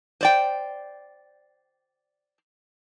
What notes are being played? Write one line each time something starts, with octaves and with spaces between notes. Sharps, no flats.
C5 D5 G5